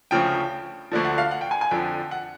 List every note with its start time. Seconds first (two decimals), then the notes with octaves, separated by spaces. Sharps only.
0.11 D2 C#3 F3 G5
0.91 D2 D3 F3
1.05 F#5
1.18 F5
1.31 F#5
1.41 G5
1.51 G#5
1.61 G#5
1.71 F2 D3 F3 G5
2.11 F#5